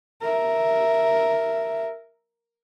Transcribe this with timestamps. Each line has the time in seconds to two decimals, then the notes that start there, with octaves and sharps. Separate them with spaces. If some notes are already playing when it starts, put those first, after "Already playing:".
0.21 A#4 E5